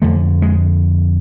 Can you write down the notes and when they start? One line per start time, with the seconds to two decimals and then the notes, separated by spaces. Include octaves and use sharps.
0.02 F2 D3 A3
0.42 G#3